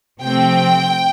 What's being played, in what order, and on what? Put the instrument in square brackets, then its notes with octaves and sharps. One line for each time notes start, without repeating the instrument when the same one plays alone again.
[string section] C3 F3 A3 C4 G5